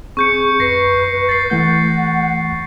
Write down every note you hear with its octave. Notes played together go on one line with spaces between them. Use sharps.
C4 G#4 C#6 G6 C#7
F#2 B4 A#6 C7
A6 C7
E3 A3 F#5 G6